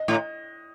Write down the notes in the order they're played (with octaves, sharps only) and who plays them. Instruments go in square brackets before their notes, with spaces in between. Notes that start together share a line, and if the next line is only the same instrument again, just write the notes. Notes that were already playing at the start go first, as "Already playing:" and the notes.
Already playing: [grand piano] D#5
[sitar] A2